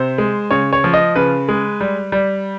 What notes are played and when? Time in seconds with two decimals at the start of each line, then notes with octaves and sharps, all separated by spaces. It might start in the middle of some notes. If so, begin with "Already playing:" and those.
Already playing: C3 C5
0.18 G#3
0.51 C#3 C#5
0.73 C#5
0.84 F3
0.94 D#5
1.16 C#3 B4
1.49 G#3
1.81 G3
2.12 G3